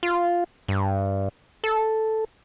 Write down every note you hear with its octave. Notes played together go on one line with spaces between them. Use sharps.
F4
G2
A4